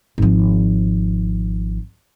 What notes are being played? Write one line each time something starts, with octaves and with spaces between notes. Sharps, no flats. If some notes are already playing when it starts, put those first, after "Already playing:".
G#1 F3